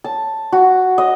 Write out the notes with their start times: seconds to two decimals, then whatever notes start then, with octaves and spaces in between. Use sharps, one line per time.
0.04 A5
0.53 F#4
0.98 D#5